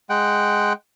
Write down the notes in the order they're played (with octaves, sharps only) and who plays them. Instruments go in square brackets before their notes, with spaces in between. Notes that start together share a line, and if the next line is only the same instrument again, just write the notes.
[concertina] G#3 F#5 G5